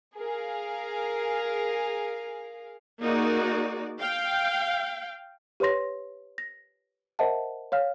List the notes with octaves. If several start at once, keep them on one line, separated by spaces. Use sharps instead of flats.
G#4 A#4 F5
A#3 D#4 F#4 G#4 D5
F5 G5
G4 B4 C#5 C6 A#6
A#6
A#4 C5 D#5 E5 F#5 A5
C#5 F5 F6